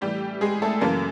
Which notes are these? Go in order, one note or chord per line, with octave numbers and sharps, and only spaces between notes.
A2 E3 G3 G4
G#3 G#4
A3 A4
F#2 C#3 E3 A#3 A#4